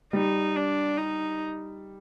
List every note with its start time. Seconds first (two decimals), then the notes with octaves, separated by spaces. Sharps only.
0.13 G3 D#4
0.56 D4
0.97 D#4